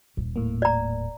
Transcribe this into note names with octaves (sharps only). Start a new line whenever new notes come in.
D#1
A2 A#3
D5 A#5